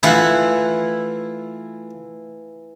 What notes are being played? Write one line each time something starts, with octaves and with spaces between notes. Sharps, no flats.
E3 A3 E4 F4 F#5